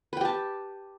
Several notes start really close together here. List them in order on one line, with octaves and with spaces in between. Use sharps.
B4 G5 G4 A5